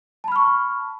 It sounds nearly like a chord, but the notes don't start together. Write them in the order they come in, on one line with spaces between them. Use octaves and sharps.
A5 B5 F6 C#6